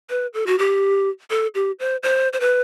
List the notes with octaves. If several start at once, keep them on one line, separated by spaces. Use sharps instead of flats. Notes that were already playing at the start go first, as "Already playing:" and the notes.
B4
A4
F#4
G4
A4
G4
C5
C5
C5
B4